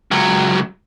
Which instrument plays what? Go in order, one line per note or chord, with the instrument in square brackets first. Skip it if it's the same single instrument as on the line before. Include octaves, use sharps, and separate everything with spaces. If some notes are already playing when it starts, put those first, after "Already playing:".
[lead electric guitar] C#2 F#3